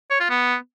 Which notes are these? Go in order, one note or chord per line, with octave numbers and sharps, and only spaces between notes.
C#5
F4
B3